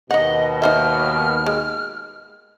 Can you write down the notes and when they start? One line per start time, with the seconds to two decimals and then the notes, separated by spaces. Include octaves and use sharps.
0.11 D#2 B2 D#4 D#5 F#5
0.62 D#4 C5 E5 F6
1.46 G#3